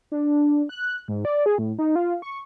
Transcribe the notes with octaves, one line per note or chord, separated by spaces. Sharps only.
D4
F#6
G#2
D5
G#4
A2
D#4
F4
C#6